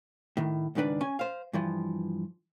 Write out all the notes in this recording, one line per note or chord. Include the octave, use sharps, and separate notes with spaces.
A2 D#3
C#2 G#2 D#3 D4 B4 D5
C#4 G#5
C5 F5
G2 E3 F3